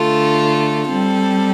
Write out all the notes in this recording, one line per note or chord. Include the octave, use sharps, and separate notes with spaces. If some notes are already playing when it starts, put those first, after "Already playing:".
Already playing: D3 A3 F4 A4
G3 C4 A4